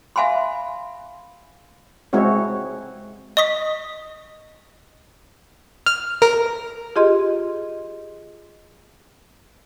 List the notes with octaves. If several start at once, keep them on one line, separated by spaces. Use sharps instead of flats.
E5 F5 G#5 B5 C6
G#3 C4 E4 F#4 C#5
D#5 C#6 D#6 B6
F6
A#4
F4 G4 G#4 D#5 C6